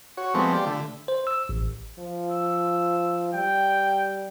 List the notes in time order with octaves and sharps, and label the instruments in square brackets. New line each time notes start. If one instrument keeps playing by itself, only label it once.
[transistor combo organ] F#4 C#5
F3 G#3 A3 B3 C4
F4 G4 D5
D3 A3
[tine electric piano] C5
E6
A1
[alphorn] F3
[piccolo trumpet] E6
[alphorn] G3 [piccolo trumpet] G5